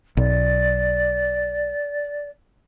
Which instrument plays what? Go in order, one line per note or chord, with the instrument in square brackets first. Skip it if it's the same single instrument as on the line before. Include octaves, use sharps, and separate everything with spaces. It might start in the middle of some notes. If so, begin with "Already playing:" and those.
[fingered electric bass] B1 [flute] D5